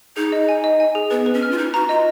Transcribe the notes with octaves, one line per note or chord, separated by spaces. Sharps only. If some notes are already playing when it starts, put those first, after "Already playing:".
D#4 G#4
D#5
G#5
D#5
G#5
G#4
B3 B4
B4
C#4
F6
F4
D#4 B4
F#4 A#5
F4 D#5